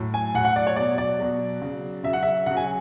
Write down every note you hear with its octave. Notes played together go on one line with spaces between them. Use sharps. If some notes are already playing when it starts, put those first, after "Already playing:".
Already playing: A2 F#3
G#5
A2 F#3 F#5
F#5
D5
C#5
B2 F#3 D5
D5
B2 F#3
C#3 F#3
C#3 F#3 E5
F#5
E5
C#3 F#3 F#5
G#5